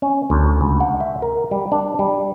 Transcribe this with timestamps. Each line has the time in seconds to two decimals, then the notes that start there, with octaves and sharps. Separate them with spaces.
0.02 C#4
0.30 D2
0.61 C#2
0.80 F#5
1.00 E5
1.22 A#4
1.51 G3
1.72 D4
1.99 G3